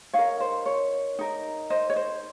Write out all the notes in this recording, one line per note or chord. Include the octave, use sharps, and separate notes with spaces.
D#4 A#4 C#5 F5
C5
C#5
D#4 A#4
C5 D#5
C#5
C5